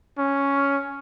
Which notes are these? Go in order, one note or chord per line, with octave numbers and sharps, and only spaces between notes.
C#4